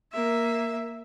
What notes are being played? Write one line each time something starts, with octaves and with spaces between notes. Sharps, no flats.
A#3 E5